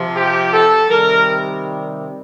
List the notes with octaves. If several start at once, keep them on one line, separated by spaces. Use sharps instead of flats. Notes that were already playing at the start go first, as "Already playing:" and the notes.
Already playing: C3 F3
G4
A4
C3 D#3 G3 A#4